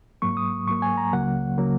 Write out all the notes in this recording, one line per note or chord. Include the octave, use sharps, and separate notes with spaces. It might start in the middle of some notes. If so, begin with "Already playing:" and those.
G#2 F#3 A#3 C#6
D#6
G#2 F#3 A#3 C#6
G#5
A#5
C#2 C#3 F#3 A#3 F#5
C#3 F#3 A#3